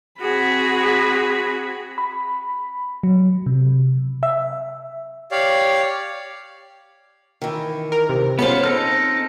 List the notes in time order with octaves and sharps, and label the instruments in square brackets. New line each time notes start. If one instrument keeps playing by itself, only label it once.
[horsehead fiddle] C4 B5 [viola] F#4 G#4
[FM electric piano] B5
F#3
C3
E5
[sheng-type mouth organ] G4 C#5 D5 F5
[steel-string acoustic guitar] D#3 E3
[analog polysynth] A#4
C3
[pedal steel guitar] B3 F4 [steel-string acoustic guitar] C#4 G#4 C5 [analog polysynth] C#7
[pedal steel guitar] C4 D#4 F6 [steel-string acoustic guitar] A4